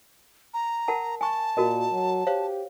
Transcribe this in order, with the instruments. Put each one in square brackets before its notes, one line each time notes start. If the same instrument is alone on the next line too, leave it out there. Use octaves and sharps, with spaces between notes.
[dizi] A#5
[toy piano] A#4 F#5 A5
[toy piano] G#5 C#6 [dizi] A5
[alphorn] A#2 [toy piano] F#4 A#4 D#5
[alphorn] F#3
[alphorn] G4 [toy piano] C5 C#5 F5